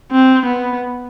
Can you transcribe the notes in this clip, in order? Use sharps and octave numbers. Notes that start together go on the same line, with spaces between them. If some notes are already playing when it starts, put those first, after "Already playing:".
C4
B3